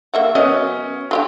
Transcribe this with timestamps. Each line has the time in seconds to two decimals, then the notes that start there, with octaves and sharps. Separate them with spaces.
0.14 A#3 E5 F#5
0.35 F#3 B3 C#4 D#5
1.11 F#3 F4 G4